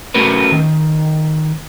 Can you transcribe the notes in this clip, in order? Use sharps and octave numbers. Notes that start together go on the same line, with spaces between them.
A3 C#4 F#4 A#4 B4
D#3